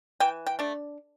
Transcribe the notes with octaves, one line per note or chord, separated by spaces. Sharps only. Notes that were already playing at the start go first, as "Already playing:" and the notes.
E3 G5
G5
A3 D4